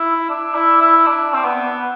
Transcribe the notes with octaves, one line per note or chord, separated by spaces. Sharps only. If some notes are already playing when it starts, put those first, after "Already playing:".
Already playing: E4
D4
E4
E4
D4
C4
B3